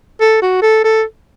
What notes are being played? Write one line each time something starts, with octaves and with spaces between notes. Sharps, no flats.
A4
F#4
A4
A4